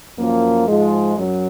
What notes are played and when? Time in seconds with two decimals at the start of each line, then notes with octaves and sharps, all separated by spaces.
0.18 F#2 F3 A#3
0.68 G#2 F3 G#3
1.16 F#2 F#3